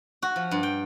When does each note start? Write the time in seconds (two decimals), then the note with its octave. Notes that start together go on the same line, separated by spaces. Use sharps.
0.22 F#4
0.36 F3
0.51 G2
0.63 G5